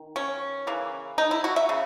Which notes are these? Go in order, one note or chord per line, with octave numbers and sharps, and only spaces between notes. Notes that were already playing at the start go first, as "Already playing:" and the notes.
Already playing: D#3
C#4
C#3 E3 A#3
D#4
E4
F#4
E5
C#3